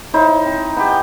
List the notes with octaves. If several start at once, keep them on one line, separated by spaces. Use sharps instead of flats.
D#4 E4 C5 C#5
C4
B3 G4
G5 G#5